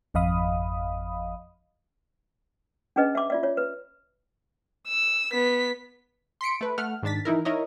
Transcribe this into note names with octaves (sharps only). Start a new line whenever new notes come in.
G#1 F2 D#5 F5 B5 D#6
C#4 D4 G#4 B4 D#5
E5 D6
F4 D5 E5
F4 C#5
B4
E6
B3 B6
C6 B6 C#7 D7
A3 B4
A3 F#5 F6
G#2 D#3 D4 A6 B6
E3 D#4 E4 A#4
D#4 E4 A#4 C#5 D#5